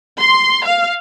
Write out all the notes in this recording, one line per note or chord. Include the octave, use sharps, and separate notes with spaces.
C6
F5